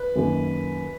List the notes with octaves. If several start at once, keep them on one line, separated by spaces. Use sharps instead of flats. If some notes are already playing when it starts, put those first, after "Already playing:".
Already playing: B4
F#2 D#3 F#3 A#3